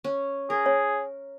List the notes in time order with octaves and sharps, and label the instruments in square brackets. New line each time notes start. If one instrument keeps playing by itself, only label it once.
[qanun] C#4
[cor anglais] G#4 [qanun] A#4
[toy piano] C#5